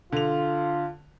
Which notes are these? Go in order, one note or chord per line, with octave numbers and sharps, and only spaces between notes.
D3 F4 F7